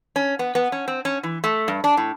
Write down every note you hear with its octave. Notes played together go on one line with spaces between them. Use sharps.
C#4
B3
B3
C#4
C4
C#4
E3
A3
G2
D4
A2